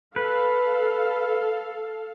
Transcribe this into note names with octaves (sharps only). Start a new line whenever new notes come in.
A4 B4 F5